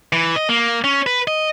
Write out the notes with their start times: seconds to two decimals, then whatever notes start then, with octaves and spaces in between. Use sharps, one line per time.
0.13 E3
0.36 D#5
0.49 A#3
0.84 C#4
1.06 B4
1.27 D#5